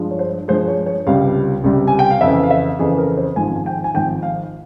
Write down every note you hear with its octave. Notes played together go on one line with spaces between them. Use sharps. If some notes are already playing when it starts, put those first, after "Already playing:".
Already playing: G2 F3 G#3
C#5
C5
G2 F3 G#3 C5
C#5
C#5
C#2 C3 G3 F5
C#2 C3 G3
G#5
G5
F5
F2 C#3 E3 E5
F5
E5
F2 C#3 E3 G#4
A#4
C5
G#1 G#2 F3 G#5
G#5
G5
G#5
G#1 G#2 F3 G5
F5